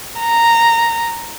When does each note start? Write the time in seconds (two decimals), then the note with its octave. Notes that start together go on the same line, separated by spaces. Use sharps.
0.20 A#5